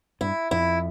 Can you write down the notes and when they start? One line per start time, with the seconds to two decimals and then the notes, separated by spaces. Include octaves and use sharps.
0.21 G2 E4
0.51 F2 E4